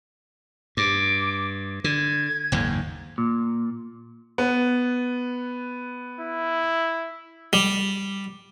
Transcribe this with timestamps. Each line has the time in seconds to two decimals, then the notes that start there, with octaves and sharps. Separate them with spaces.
0.77 G2 D6
1.84 D3 G#6
2.52 F#1 D#2 G#2
3.18 A#2
4.38 B3
6.20 E4
7.53 G3